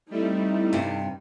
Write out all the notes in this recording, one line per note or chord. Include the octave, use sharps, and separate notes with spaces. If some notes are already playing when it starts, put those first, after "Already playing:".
G3 A3 C4 D#4 E4
G2 C3